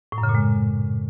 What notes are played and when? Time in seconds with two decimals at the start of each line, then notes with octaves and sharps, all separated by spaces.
0.12 A2
0.18 F#2
0.23 C#3
0.29 A#2
0.35 G#3